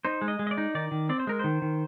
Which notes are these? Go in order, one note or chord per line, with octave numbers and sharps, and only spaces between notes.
D#4 C5
G#3
D#5
G#3
D#5
D5
D#4
D#3 D5
D#3
C4 D5
C5
G#3 A#4
D#3 C5
D#3